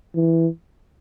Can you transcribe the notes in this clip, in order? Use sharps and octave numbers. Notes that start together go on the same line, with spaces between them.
E3